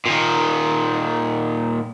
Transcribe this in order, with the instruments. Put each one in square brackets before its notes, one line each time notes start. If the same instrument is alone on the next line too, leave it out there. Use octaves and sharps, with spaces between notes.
[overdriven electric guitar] A#2 D#3